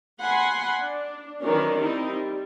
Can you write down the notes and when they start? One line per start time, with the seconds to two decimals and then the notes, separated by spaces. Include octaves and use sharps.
0.20 F#5 G#5 B5 C6
0.78 D4
1.42 D#3 E3 F#3 C#4 D4
1.79 G3 C4 D#4 E4
2.09 G3